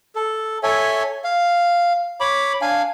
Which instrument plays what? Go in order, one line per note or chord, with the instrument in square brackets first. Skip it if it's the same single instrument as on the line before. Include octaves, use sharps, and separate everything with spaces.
[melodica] A4
A4 C#5 E5 G#5
F5
C#5 B5 D6
D4 F5 G#5